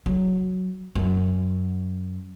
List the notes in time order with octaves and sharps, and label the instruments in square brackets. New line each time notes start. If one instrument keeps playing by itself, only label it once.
[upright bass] F#3
F#2